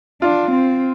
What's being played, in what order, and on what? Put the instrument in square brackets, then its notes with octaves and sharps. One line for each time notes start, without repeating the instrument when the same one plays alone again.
[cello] D4 [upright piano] F4
[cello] C4